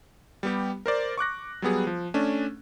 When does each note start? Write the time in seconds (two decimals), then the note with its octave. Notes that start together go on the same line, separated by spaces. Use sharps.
0.43 G3 B3 G4
0.86 A#4 C5 D5
1.17 C#6 D6 F#6 A#6
1.62 F#3 G3 B3 G#4
1.87 F3
2.14 A3 C#4 D4